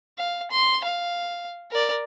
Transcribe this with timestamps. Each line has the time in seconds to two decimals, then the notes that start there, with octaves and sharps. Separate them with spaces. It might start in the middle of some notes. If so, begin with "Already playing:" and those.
0.18 F5
0.51 C6
0.84 F5
1.71 A#4 D5